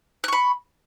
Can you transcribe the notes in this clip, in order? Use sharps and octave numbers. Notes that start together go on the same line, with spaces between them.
B5 C#6 F#6